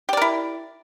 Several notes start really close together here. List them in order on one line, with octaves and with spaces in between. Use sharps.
G4 D5 A#4 E4